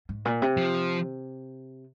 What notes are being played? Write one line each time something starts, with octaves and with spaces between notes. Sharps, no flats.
G#2
A#2
C3
F3